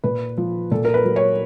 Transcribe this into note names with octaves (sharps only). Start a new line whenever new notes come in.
A#2 B4
F3
A#2 A4
A#4
B4
F#3
C#5